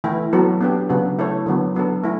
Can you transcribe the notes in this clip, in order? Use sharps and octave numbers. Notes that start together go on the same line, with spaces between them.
E3 A3 E4
F#3 B3 F#4 A4
B3 D4 G4
C#3 F#3 B3 D4 F#4
A3 E4 A4 C#5
D3 F#3 B3
F#3 B3 D4 A4
A3 E4